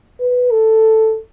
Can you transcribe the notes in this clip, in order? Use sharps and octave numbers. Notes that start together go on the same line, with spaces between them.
B4
A4